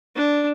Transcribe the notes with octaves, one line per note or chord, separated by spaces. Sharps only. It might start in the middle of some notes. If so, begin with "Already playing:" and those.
D4